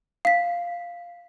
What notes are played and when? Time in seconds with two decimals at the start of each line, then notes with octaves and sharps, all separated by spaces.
0.25 F5 B6